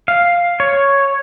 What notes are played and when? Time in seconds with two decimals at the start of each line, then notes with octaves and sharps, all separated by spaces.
0.08 F5
0.60 C#5